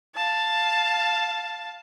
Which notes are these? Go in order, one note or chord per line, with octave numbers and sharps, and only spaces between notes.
F5 A5